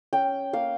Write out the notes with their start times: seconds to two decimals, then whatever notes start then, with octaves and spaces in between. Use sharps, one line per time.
0.13 C#4 G5
0.53 A#3 F5